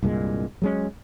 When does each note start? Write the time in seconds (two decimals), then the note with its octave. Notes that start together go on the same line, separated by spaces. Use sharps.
0.03 C2 G2 A#2 G#3
0.62 F#3 G#3 C#4